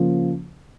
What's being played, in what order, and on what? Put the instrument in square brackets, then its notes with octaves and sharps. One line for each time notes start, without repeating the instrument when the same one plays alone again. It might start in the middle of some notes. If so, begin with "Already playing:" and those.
Already playing: [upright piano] C#3 F3 A#3